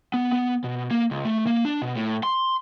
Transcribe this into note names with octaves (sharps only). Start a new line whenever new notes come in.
B3
B3
B2
A#3
C#2
A3
A#3
D4
B2
A2
C6